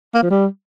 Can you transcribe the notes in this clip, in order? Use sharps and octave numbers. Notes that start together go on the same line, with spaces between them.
A#3
F3
G3